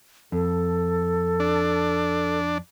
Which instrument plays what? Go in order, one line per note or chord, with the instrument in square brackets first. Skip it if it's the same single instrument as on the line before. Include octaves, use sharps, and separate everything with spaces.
[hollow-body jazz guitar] F2 [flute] A4
[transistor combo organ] D4